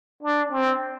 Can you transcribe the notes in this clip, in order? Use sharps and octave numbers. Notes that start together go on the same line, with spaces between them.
D4
C4